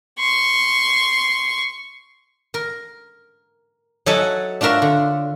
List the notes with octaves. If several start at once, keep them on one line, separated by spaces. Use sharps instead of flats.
C6 C#6
A#4
F#3 D#4 A4 E5 F#5 G#5
D4 F4 F#4 A#4 E5
D3